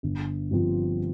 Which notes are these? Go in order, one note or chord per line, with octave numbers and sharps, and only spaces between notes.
G1
G2 F3 C4 F4